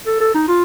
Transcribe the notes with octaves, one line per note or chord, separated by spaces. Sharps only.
A4
A4
D#4
F4